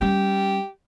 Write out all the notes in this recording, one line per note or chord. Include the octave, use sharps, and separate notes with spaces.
G3 C#4 G4